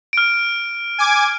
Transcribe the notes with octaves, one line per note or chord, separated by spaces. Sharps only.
F6 D7
G#5 D6 G#6